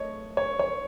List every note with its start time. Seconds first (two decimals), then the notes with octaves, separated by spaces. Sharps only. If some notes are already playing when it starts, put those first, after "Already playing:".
Already playing: A3 C#5 D#5
0.37 C#5
0.59 C#5